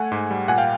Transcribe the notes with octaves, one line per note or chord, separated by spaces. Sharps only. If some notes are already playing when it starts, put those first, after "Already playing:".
Already playing: A3 F#5 G#5
G#2
G3
A#2 F#5 G#5
F5 G5